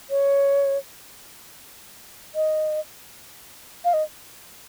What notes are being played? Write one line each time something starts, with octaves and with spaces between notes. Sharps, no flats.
C#5
D#5
F5
D#5